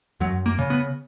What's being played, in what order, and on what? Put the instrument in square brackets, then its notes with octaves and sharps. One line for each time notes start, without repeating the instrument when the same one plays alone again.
[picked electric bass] F#2 F#3
A#3
C#3
B3